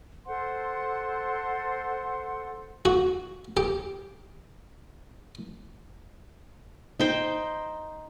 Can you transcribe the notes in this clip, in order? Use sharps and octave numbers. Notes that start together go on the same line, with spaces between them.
A4 C5 F#5 C6
F#4
G4
D#4 C5 G5